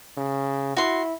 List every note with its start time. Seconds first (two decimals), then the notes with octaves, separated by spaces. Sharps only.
0.17 C#3
0.77 E4 F#4 C6